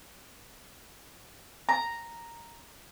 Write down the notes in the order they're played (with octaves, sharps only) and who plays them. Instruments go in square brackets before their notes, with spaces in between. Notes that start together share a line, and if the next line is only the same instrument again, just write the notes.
[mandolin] A#5